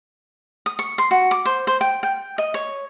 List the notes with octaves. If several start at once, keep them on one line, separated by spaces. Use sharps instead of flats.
D#6
C#6
C6
F#4
D6
C5
C5
G5
G5
D#5
C#5